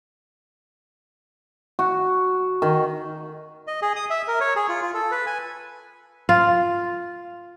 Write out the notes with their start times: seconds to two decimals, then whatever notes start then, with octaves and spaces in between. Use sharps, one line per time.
1.79 F#4
2.62 D#3
3.67 D#5
3.82 G#4
3.96 D#6
4.10 E5
4.28 A#4
4.40 C#5
4.56 G#4
4.69 F4
4.82 F4
4.94 A4
5.11 B4
5.27 G#5
6.29 F4